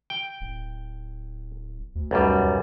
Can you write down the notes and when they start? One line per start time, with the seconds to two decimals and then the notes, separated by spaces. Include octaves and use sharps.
0.10 G5
0.41 D1
1.95 D2
2.11 B1 F#2 G3